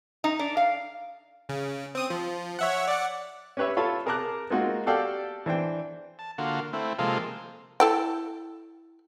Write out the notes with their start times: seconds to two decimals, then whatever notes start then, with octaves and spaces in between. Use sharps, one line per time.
0.24 D#4
0.39 D4
0.57 F5
1.49 C#3
1.95 C4 D#6
2.10 F3
2.59 C#5 E5 F#5
2.87 D5 F#5
3.57 C#4 G4 B4 C#5 E5
3.77 F4 A4 C#5 A5 B5
4.06 G#4 A#4 A5 A#5 D6 F#6
4.50 G#3 A#3 C4 D#4 F4 F#4
4.86 F#4 G4 A4 D5 F5 G5
5.46 E3 D4 C5 G5
6.19 A5
6.38 D3 A#3 F4 F#4
6.73 A3 C4 E4
6.99 C3 F3 G#3 A#3 F4 A4
7.80 E4 A4 G5